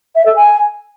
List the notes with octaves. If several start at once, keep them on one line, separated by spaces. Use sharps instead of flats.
E5
A4
G#5